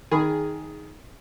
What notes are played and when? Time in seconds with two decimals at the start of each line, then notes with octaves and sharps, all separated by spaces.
0.11 D#3 G#4 B5